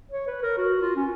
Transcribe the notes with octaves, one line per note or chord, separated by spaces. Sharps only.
C#5
B4
A#4
F#4
F4
C#4